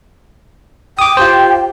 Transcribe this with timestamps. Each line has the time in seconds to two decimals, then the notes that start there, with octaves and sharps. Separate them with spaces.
0.99 G5 D6 D#6
1.17 F4 G4 C5